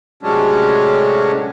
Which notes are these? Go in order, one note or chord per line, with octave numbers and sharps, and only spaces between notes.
A2 C3 F#3 G#3 C#4 D4